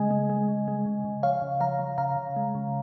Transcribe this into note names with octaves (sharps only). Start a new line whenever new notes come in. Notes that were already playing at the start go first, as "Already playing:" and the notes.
Already playing: C#3 G#3 D#5 G#5
G#3
G#3
C#3
G#3
C#3
C#3
F3 C#5 F5
C#3
F3 F5 A#5
F3
C#3 F5 A#5
C#3
G#3
C#3